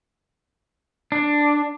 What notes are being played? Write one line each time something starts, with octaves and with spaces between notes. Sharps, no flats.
D4